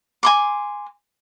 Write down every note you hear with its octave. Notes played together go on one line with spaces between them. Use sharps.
G#5 C6 D6